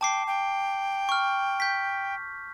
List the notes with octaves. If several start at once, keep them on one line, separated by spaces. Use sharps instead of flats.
G5 A5 D6 C7
G5
C#6 F6
G6 B6